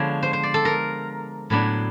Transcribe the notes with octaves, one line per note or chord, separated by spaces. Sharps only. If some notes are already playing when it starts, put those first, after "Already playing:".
Already playing: D3 F3 G#3 B3 D4 C#5
C5
C5
D5
A4
A#4
A2 F#3 B3 D4